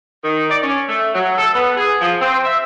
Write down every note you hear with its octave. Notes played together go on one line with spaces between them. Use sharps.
D#3
D5
C#4
A3
F#3
A4
B3
G#4
F3
C4
E5